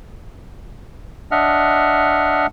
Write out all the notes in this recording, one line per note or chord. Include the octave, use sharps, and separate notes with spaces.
D4 D#5 E5 F#5 F6